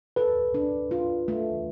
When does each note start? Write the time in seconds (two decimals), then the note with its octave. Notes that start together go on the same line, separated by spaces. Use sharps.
0.16 A4 B4
0.54 D4
0.91 F4
1.28 A3